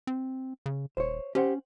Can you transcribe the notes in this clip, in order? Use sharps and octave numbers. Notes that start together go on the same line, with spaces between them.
C4
C#3
D#1 C5 C#5
C#4 G4 C5 F#5